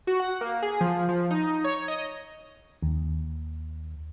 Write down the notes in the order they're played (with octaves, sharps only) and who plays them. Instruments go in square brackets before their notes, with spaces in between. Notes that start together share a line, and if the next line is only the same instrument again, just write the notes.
[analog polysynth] F#4
F#5
A#3
G#4
F3
F3
D#4
C#5
D#5
[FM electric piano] D#2